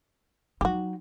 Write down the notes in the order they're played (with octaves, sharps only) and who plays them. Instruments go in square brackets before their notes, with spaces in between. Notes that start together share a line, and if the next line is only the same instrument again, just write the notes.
[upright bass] F#3 D#4 [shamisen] F#4 G4